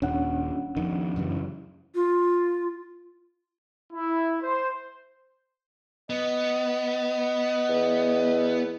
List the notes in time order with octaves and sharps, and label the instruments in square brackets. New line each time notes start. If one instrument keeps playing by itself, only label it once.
[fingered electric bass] D#1 [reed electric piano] C#4 D4 F#5
[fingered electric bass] F2 D#3
F#2 C#3 E3
[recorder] F4
[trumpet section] E4
C5
[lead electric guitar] B3 [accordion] D#5
[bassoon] E2